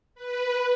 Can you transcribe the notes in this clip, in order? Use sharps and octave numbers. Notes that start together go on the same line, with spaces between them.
B4